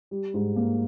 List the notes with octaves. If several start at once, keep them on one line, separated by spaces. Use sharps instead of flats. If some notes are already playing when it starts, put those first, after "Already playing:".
G3
G#2
A#3